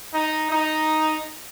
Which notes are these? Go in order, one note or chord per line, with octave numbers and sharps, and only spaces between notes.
D#4
D#4